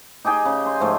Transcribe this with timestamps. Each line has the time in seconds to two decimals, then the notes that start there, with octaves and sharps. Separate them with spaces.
0.25 D#4 G4 G#4 G5
0.45 C#3
0.66 C6
0.80 G#2 F3 A3